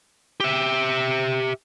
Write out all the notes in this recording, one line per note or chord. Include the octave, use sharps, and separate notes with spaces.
G4 E5